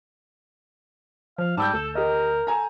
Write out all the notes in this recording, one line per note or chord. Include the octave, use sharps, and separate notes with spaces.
F3 F5
G#2 G3 A5 E6 G6
D2 A4
G4 A#4 D#5
A4 G#5 A#5